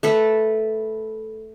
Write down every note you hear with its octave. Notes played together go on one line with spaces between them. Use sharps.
A3 A4 B4